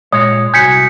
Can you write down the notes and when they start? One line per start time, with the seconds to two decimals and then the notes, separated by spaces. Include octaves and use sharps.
0.12 A#2 G#3 C#5 D#6
0.54 C2 F#4 G#5 G6 B6 C#7